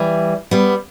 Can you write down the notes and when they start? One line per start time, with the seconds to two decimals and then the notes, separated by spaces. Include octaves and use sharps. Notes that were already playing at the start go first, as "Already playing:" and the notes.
Already playing: E3 G3
0.51 G3 B3